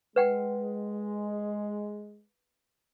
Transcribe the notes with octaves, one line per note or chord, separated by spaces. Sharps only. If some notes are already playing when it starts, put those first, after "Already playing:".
G#3 B4 F#5 G5